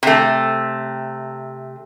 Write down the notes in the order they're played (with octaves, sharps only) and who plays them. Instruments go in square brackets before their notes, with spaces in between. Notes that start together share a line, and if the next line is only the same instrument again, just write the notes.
[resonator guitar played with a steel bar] C3 A3